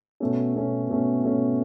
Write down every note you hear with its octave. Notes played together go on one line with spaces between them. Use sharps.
B2 A3 C#4
B2 A3 C#4
B2 A3 C#4
B2 A3 C#4